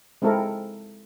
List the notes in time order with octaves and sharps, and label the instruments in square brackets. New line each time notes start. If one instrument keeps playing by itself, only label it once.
[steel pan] G#3 C4 E4 A4 A#4